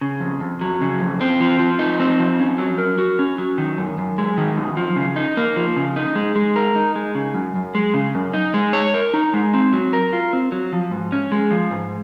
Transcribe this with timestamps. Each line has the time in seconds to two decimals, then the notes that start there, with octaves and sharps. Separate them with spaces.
0.01 C#3
0.20 F2
0.40 F2
0.61 F#3
0.81 C#3
1.00 F2
1.21 C4
1.40 F3
1.59 F3
1.79 D#4
2.00 C4
2.19 F3
2.40 C#4
2.58 F#3
2.78 A#4
2.98 F#4
3.19 C#4
3.38 F#3
3.58 D#3
3.78 F#2
3.98 F#2
4.18 G#3
4.38 D#3
4.57 F#2
4.77 F3
4.96 C#3
5.16 D#4
5.37 A#3
5.56 F3
5.77 C#3
5.96 D#4
6.15 G#3
6.36 G#3
6.56 A#4
6.76 D#4
6.96 G#3
7.15 C#3
7.34 F#2
7.55 F#2
7.75 G#3
7.94 C#3
8.15 F#2
8.33 D#4
8.54 G#3
8.73 C#5
8.94 A#4
9.14 D#4
9.34 G#3
9.53 C4
9.73 F#3
9.93 A#4
10.13 F4
10.33 C4
10.52 F#3
10.73 F3
10.91 G#2
11.12 C#4
11.32 G#3
11.51 F3
11.71 G#2